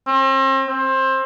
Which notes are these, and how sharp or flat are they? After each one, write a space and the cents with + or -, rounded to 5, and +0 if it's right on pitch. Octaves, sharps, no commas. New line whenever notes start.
C4 +40
C4 +20